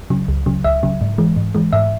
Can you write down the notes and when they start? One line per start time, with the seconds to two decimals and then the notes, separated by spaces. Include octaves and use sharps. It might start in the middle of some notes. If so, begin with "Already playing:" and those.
0.10 C#3 F#3
0.28 C#2
0.46 C#3 F#3
0.64 C#2 E5
0.83 C#3 F#3
1.01 G#2
1.18 E3 G#3
1.36 G#2
1.55 E3 G#3
1.73 G#2 E5